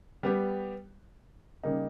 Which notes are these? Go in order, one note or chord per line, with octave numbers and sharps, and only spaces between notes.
G3 B3 G4
C#3 G3 A#3 D#4